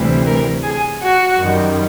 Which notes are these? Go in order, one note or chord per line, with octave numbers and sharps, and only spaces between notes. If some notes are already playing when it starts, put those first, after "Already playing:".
Already playing: D2 C3 E3 G3
A#4
G#4
F#4
F#2 D#3 G3